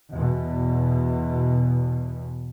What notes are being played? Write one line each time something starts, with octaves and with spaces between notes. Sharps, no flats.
E2 B2